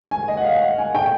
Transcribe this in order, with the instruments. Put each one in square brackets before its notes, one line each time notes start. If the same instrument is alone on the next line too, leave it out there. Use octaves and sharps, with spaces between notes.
[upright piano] G#5
D#5
F#5
F5
F#5
G#5
G5